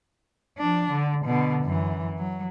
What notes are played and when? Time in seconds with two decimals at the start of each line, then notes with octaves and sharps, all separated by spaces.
0.58 F3 D4
0.91 D3
1.25 B2 D3
1.64 F#2 E3
2.18 F#3